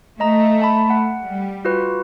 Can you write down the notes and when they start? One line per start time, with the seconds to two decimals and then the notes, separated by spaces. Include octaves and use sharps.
0.20 A3 D#5 A#5
0.59 E5 A5 B5
0.90 F#5
1.23 G3
1.65 F4 F#4 B4